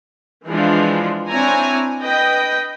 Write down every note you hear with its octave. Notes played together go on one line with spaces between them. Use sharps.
E3 F3 G#3 D4 F4
C4 D4 E4 C#5 G#5 A#5
B4 D#5 G5